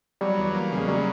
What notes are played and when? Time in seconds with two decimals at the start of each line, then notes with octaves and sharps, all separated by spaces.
0.21 F#3 G3
0.38 E2
0.54 A#3
0.72 C#3
0.77 G#3
0.88 F#3 G3